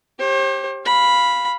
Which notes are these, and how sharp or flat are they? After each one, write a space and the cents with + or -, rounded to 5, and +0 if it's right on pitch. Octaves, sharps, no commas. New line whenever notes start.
G4 +0 C5 +45
F5 +0 B5 -5